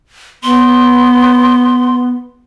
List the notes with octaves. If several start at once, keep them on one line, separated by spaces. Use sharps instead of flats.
B3 C6